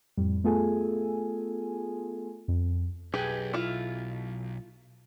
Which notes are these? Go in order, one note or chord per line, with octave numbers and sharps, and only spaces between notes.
F2 A2 G3
A3 B3 F4 G#4 A4 G#5
F2
B1 G4 G#4 B4
E4 F4